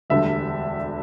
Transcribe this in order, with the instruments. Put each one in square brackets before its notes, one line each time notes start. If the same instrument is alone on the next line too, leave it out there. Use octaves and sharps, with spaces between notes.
[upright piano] E1 D2 D3 G3 E5